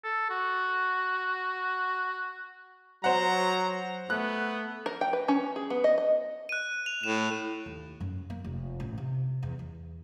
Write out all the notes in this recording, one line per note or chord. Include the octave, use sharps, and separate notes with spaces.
A4
F#4
F#3 C5 F#5 A#5
A3 B3 F#6
A#4
G5
B4
C#4
G#4
B3
D#5
D#5
F#6 D#7
F7
A2 E7
D#2
F#2
A#3
F1
A1
C3
E2
E2